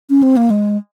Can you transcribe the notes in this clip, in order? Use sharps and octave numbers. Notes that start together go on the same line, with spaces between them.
C#4
C4
A#3
G#3